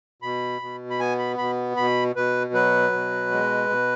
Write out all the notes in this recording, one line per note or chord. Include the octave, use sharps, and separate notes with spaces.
B2 B5
B2
B5
B3 G#5
B5
B2 B5
B2 B5
B2 B4
F#3 B4
B2
G#3
B2